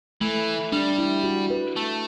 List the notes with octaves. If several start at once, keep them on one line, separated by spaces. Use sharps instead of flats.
E3 A3
G3 D4
E4
F#4
B4
A3